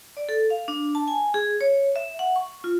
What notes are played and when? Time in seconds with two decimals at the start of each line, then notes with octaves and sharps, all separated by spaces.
0.17 D5
0.29 A4
0.50 F5
0.68 D4
0.95 A5
1.08 G#5
1.34 G#4
1.61 C#5
1.96 E5
2.19 F#5
2.36 C#6
2.64 F4